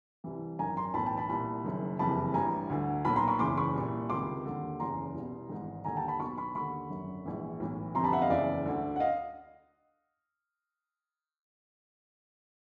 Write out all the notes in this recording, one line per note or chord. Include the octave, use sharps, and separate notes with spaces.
C2 C3 E3
G#1 F#2 D#3 G#5 A#5
A#5 C6
B1 A2 E3 A5 B5
G5 A5
A5 B5
C2 A#2 A5 B5
F#1 F#2 D#3
F#1 F2 C3 E3 A5 B5
A1 G2 E3 G#5 A#5
D2 D3
B1 A#2 A5 B5
A#5 C6
B5 C#6
F#1 E2 C#3 E3 C6 D6
B5 C#6
C2 A#2
C#2 C3 D#3 C6 D6
D#2 D3
F#1 E2 C#3 A#5 C6
C2
B2
G#1 G#2 E3
D#2 D3 G#5 A#5
G5 A5
A5 B5
B1 B2 B5 C#6
B5 C#6
D#2 D3 B5 C#6
G#1 F#2 D3
A#1 G#2 E3
B1 A2 E3
G1 F2 C3 A#5 C6
A5 B5
E5 F#5
D#5 F5
F#1 E2 C#3 D5 E5
D2 D3
F#5
D#5 F5